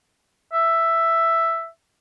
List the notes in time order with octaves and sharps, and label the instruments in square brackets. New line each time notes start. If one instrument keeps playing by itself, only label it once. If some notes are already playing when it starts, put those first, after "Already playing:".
[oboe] E5